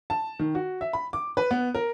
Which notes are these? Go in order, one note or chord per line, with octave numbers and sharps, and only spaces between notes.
A5
D#3
F#4
E5
B5
D6
B4
B3
A#4